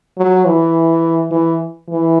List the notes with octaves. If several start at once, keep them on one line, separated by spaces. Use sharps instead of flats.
F#3
E3
E3
E3